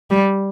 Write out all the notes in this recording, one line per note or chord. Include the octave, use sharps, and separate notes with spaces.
G3